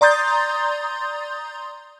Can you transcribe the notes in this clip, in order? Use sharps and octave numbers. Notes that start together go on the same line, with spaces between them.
D5 A#5 C6 D#6 G6 A6